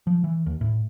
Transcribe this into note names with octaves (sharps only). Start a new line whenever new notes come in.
F3
E3
D#2
A2